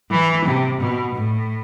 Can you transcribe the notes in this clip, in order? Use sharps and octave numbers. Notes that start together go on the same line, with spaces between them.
E3
C3
B2
A2